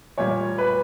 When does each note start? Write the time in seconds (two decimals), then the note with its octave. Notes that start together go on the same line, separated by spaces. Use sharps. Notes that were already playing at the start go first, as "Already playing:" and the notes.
0.18 A#2 G3 A#3 C#5
0.58 B4